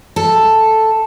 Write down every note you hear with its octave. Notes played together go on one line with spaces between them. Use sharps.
A4